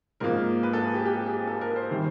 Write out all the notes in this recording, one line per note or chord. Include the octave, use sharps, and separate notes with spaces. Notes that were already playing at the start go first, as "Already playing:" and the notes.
G#2 F3 A#3 A#4
B4
A4
G#4
G4
G4
G#4
A4
A#4
C5
C3 D#3 G3